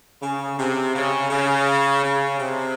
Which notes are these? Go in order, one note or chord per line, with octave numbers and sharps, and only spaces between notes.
C#3
C3
C#3
C#3
C#3
C3